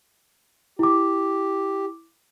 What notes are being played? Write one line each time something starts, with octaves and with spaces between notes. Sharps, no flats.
E4 G4 D6